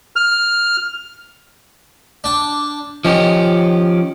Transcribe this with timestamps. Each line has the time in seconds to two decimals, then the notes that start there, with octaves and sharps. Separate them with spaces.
0.16 F6
2.24 D4 G5
3.05 D#3 F3 C#4 G4